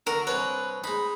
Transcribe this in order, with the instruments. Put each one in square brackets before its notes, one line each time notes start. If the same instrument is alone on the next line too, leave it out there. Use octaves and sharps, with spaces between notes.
[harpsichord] D3 F#4 [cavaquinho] A#4
[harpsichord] C2 D4 C#5 [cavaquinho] B4
[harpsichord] G#3 D#4 [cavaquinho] B5